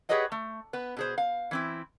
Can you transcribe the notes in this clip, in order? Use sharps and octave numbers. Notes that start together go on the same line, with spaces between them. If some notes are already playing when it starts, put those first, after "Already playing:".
G4 G#4 B4 C#5 D#5 F#5
A3
B3 B4
B2 G#4 C5
F5
E3 C4 E4